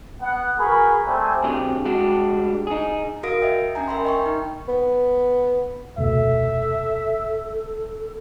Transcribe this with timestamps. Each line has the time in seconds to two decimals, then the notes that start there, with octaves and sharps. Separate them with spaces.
0.21 B3 F#5
0.58 F#4 G#4 A#4 B4 B5
1.06 G3 A3 C4 G#5
1.44 B1 B2 D3 C4 G4 G#4
1.85 G3 G#3 D4 F#4 G4
2.67 D#4 G#4
3.23 F#4 A#4 F5 D#6 A#6 D7
3.42 D#5 E5 G5
3.75 C#4 D4 G5 G#5 A#5
3.88 A#4 E5 B5 C6
4.05 D#5 G5 C#6
4.26 D#4
4.68 B3
5.98 F1 D2 B2 A4 E5